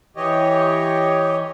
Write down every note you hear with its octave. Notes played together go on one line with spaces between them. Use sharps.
E3 G4 C#5 D#5